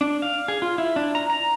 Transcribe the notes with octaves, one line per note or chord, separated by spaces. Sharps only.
D4
F5
G#4
F4
E4
D4
A#5
A#5